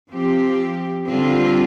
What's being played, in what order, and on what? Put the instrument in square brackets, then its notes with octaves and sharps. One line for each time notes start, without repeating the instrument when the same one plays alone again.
[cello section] F3 C4 G4
D3 G3 C4 F4